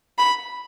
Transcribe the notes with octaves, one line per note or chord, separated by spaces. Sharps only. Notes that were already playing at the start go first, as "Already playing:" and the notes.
B5